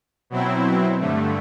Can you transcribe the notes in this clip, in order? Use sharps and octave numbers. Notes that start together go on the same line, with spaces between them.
B2 F#3 C4 E4
G2 D3 A3